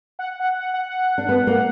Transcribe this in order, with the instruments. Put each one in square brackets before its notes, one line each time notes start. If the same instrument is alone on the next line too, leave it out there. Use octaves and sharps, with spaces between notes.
[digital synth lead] F#5
F#5
F#5
F#5
F#5
[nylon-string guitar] D4
B3
A#3